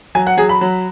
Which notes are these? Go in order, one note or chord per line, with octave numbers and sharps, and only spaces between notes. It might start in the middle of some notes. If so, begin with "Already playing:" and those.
F#3 G#5
F#5
F#3 G#4
B5
F#3